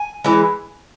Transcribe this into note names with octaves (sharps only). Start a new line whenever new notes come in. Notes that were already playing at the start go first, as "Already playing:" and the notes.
Already playing: G#5
E3 G#3